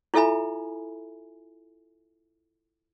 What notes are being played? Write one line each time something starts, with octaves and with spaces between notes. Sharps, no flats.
E4 F4 A4 E5 G#5 B5